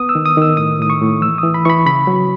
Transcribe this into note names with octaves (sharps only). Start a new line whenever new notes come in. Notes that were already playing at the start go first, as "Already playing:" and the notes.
Already playing: B3 D#6
E6
D#3
D#6
D#3 E6
A2 D#6
A2 D#6
C#6
A2
E3 E6
D#6
E3
B5
E3 B5 C#6
C#3 B5
F#3